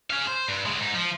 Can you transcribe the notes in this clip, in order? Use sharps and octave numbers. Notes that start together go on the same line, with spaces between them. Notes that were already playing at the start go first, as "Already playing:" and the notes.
G#4 F5
C5
G2
D3 G#3
G#2 D#4
F3